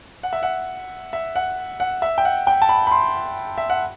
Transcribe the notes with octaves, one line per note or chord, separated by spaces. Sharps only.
F#5
E5
F#5
E5
F#5
F#5
E5
G5
F#5
G5
A5
B5
B5
C6
E5
F#5